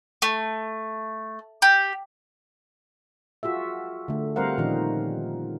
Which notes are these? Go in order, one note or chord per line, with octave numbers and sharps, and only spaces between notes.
A3
G4
F4 F#4 G#4 E5
D3 A3
G3 C4 A#4 C5 F5 F#5
A#2 D#3 F3 C#4 D#4